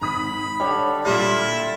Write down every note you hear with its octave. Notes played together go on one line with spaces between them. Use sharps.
G#1 B5 D#6 B6
D3 G3 C#5
A#2 G3 E4 F4 G4 E5 F5